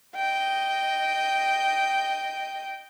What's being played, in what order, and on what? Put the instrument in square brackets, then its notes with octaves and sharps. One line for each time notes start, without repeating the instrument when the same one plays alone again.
[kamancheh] D#5 G5